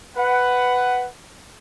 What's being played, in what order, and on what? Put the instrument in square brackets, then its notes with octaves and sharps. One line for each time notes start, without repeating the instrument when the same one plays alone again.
[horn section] B4 F#5